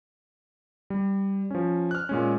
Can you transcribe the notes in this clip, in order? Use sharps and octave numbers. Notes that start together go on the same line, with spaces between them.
G3
F3 C#4
F6 F#6
A#2 G#3 C#4